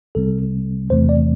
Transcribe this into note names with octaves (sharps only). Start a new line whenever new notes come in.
C2 C3 G3 C4 A4
E2 C3 E3 A3 C4 C5
D5